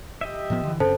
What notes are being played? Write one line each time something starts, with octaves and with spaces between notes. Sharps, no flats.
G4 D#5 E5
A2 F3 B3
D3 E3
F#2 C#3 C4 A4 C5 A5